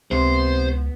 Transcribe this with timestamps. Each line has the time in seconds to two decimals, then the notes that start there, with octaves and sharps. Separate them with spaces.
0.11 C#2 C3 B3 C5